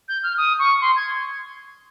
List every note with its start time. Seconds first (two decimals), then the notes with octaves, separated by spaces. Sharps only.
0.08 G6
0.23 F6
0.38 D#6
0.59 C#6
0.81 C6
0.96 G#6